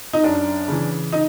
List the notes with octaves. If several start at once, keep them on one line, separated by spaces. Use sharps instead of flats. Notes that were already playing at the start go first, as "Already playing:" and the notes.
D#4
F#2 D4
C#3 E3
D#4